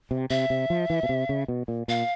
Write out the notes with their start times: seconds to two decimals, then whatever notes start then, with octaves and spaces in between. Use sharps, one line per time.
0.11 C3
0.30 C3 E5
0.50 C3
0.70 F3
0.90 E3
1.03 B2
1.09 C3
1.29 C#3
1.48 B2
1.68 A#2
1.88 A#2 F5